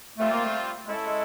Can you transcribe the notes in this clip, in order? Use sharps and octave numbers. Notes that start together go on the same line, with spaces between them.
G3 A3 C4 F4
A#3
A3
G#3 C#4 E4 A4
G#3